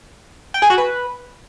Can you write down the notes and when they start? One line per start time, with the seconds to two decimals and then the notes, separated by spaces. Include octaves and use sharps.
0.54 G5
0.62 G#4
0.70 F#4
0.78 B4